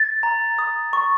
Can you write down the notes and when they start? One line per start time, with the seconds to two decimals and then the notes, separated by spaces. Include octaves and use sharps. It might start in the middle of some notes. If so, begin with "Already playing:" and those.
Already playing: A6
0.23 A#5
0.59 D#6
0.93 C#6